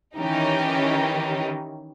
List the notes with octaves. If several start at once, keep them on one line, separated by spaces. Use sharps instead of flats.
D#3 E3 C#4 D#4 G4